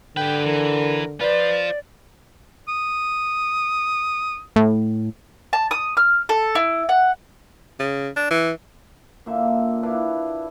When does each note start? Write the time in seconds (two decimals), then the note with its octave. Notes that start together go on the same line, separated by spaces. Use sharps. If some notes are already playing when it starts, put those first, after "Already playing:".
0.17 D3 G4 B4 G5
0.46 E3 A#4
1.21 F4 B4 C5 D5
2.68 D#6
4.56 A2
5.53 A5
5.71 D#6
5.97 F6
6.29 A4
6.55 E4
6.89 F#5
7.79 C#3
8.16 D4
8.30 E3
9.26 A#2 D3 A#3 E5
9.83 D4 E4 B4 F5